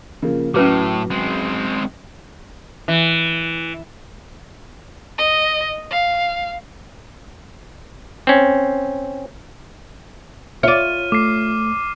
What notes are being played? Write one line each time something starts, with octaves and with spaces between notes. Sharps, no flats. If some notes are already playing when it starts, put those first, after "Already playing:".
C#3 F3 A#3
A2 F#3 C#4 B4 D6
G#3 C4
E3
D#5
F5
C4 C#4
F4 C#5 D5 E5 F6 D#7
A3 D6 C7